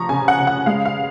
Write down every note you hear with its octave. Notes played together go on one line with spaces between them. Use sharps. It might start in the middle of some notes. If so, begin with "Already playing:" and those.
Already playing: F3 A#5 C#6
C#3 G#5
F#5
C#3
F#5
G#3 F5
F5